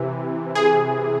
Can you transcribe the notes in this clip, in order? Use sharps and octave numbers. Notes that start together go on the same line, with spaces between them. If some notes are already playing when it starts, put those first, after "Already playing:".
Already playing: C3 E3
G#4